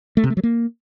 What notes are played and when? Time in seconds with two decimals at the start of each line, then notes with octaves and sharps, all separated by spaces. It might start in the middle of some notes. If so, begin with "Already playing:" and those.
0.17 A3
0.24 C3
0.30 A3
0.37 F#3
0.43 A#3